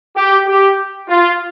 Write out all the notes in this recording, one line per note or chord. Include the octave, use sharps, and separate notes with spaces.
G4
G4
F4